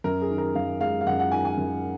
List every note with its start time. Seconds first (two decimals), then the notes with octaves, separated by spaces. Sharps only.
0.04 F#2 A#4
0.22 G#4
0.30 D#3
0.38 A#4
0.55 F#2 F5
0.81 G#3 F5
1.01 F5
1.06 F#2 F#5
1.20 F#5
1.31 D#3 G#5
1.45 G#5
1.57 F#2